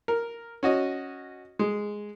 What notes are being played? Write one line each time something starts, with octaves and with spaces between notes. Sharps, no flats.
A#4
C#4 F#4 D#5
G#3